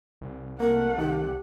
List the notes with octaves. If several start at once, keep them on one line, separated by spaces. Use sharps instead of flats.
C2
A3 A#3 A#4 F#5
D#3 G4